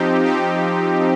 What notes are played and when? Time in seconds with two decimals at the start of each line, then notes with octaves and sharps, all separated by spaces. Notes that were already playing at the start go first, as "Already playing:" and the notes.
Already playing: F3 C4 D#4 G4
0.25 F3 C4 D#4 G4